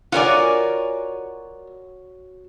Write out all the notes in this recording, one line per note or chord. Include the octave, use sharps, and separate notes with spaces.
F4 F#4 A#4 C#5 D5 G#5